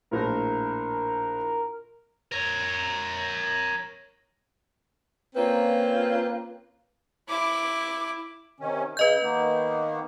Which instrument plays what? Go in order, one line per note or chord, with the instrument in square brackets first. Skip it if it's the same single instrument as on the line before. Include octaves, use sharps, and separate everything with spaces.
[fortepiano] A#1 A2 [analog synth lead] A#4
[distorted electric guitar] A#4 C#5
[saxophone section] A#3 C4 C#4 F4 B4
[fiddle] E4 D6
[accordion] C3 D#3 C#4
[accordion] C#3 [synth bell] B4 D#5 G6
[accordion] D#3 A#3 B3